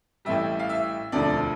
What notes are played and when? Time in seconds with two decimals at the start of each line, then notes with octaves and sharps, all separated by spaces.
0.25 A1 A2 E3 G3 E5
0.59 F5
0.69 E5
1.12 E1 D2 D3 F3 D5